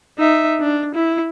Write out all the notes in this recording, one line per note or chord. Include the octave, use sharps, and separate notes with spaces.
D#4 E5
D4
E4